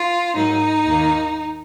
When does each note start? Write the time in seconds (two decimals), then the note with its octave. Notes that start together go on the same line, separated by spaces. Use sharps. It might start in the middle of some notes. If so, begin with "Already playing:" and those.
Already playing: F4
0.35 G#2 F#3 A#3 D#4
0.86 D#2 D#3 A#3